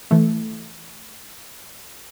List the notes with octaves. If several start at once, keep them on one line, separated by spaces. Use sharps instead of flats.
E3 A3